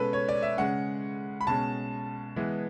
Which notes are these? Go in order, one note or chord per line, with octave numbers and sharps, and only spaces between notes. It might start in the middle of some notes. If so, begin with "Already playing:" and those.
Already playing: B2 G#3 C#4 A4 B4
C#5
D5
E5
C#3 G#3 C#4 F#5
B5
B2 G#3 C#4 A5
E3 G#3 B3